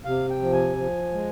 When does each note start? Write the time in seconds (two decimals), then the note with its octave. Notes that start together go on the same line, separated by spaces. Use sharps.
0.05 C3 F5
0.30 G5
0.42 F3
0.53 G#5
0.77 F3
1.13 G#3